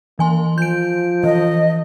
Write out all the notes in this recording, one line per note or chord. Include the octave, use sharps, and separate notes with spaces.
E3 A#3 G#5 C6
F3 G6 D7
E3 D#5